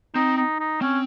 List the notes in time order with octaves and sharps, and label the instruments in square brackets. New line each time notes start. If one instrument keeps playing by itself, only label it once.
[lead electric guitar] C4 [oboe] D#4
[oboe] D#4
D#4
[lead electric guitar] C4 [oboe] C#4